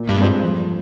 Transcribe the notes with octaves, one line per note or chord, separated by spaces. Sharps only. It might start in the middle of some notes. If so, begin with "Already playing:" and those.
Already playing: A#2
G2
G#3 C4 F4 C5
F2